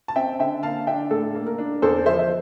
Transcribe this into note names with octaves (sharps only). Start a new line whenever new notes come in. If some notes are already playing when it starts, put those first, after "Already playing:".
A5
C4 E5 G5
D3 E5 G5
A#3 F5 A5
D4 E5 G5
A2 A4
A#3
A#4
D4
E2 A4 C5
F3 C5 E5
E5